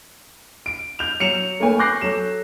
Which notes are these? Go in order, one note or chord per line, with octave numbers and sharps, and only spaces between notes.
D7
G6 F7
F#3 C#7 E7 F7
A3 A#3 B4 C#5 G#5
C#6 D6 F#6 G6 A#6 C7
F#3 A4 E7